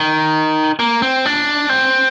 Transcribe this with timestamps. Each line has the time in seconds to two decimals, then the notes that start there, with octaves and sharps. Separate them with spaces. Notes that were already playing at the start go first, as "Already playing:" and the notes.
Already playing: D#3
0.79 A#3
1.02 C4
1.25 D4
1.69 C4